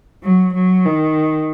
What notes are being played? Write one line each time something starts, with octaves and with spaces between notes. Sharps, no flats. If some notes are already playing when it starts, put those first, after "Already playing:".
F#3
F#3
D#3